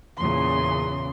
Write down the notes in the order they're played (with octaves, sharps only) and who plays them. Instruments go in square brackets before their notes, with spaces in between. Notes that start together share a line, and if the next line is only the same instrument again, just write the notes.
[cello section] E2 A#2 C#3 [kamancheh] C6